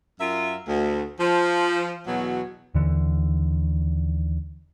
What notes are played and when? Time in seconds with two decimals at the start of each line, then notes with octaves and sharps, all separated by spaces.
0.20 F#2 F4 A#4 E5
0.67 D2
1.20 F3
2.07 E2 B2 F#3
2.75 D#2 D3 E3